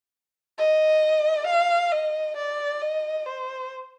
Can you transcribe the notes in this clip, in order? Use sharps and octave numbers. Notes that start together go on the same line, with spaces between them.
D#5
F5
D#5
D5
D#5
C5